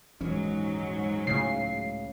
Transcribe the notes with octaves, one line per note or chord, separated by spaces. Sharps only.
D#1 G#2 E3 F#3 C#4
C#2 A2 C#3 C7